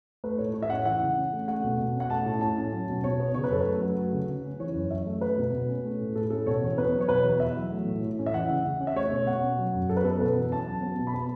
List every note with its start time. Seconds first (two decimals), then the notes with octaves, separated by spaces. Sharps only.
0.24 A3 B4
0.38 A2 C#5
0.54 A2 C#5
0.62 E5
0.70 C#4 F#5
0.85 E3 F#5
1.02 C#3
1.17 C#4
1.33 A3
1.48 A3 F#5
1.64 B2
1.79 B2
1.95 C#4
2.00 F#5
2.10 A3 A5
2.26 A2
2.41 A2 A5
2.58 C#4
2.72 F#3
2.89 B2
3.04 B2 C#5
3.20 B3
3.34 C#3 C#5
3.44 B4
3.50 F#2 A4
3.61 B4
3.67 A3
3.81 F#3
3.97 A3
4.13 C#3
4.29 C#3
4.44 C#4
4.59 E3 C#5
4.75 F#2
4.91 F#2 E5
5.06 A3
5.21 A3 B4
5.37 B2
5.53 B2
5.69 C#4
5.85 A3
6.00 A2
6.16 A2 A4
6.30 C#4 A4
6.46 B2 C#5
6.62 E2
6.78 B3 B4
6.94 F#3
7.01 C#5
7.09 B2 B4
7.24 E2
7.40 E2 E5
7.56 F#3
7.71 A3
7.86 A2
8.02 A2
8.19 C#4
8.26 E5
8.34 E3 F#5
8.49 C#3
8.65 C#3
8.80 C#4
8.87 E5
8.96 A3 C#5
9.11 B2
9.27 B2 F#5
9.43 C#4
9.58 F#3
9.74 F#2
9.89 F#2 A4
9.97 B4
10.04 B3 A4
10.20 B2 B4
10.36 E2
10.52 C#4 A5
10.67 F#3
10.83 B3
10.99 B2
11.07 B5
11.14 B3 A5